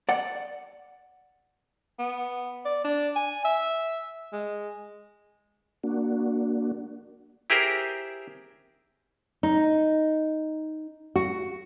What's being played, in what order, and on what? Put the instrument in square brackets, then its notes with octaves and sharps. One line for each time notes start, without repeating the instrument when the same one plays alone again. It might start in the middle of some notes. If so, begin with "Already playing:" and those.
[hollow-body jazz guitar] D5 F#5
[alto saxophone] B3
D5
D4
G#5
E5
G#3
[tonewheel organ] A#3 D4 F#4
[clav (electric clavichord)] E4 G4 G#4 A#4 C5
[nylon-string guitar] D#4
F#4